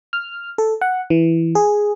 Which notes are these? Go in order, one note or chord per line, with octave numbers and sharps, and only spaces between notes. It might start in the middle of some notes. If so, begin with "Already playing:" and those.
F6
A4
F#5
E3
G#4